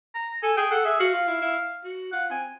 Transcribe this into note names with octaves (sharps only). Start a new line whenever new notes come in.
A#5
A4 G#5
G#4 G5
A4 F#5
G#4 E5
F#4 F5
F4
E4
E4
F#4
F4 F#5
C4 G#5